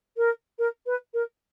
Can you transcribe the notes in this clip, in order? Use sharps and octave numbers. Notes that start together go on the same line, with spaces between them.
A#4
A#4
B4
A#4